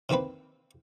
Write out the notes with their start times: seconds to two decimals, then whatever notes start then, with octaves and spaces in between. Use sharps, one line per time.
0.09 C3 D#3 A#3 C4 B4